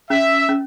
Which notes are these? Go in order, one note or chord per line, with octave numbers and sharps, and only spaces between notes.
C#4 E5
C#4